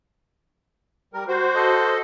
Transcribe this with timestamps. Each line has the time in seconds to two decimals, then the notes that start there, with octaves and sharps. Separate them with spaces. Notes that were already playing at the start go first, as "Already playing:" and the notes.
1.14 G3 A#4
1.28 F#4 C5
1.55 A4 D#5